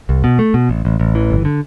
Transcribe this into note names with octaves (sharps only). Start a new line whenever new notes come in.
C2
B2
A3
B2
A1
A1
A1
E3
G1
D3